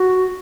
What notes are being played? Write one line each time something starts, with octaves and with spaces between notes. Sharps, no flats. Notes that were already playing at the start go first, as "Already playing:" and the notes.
Already playing: F#4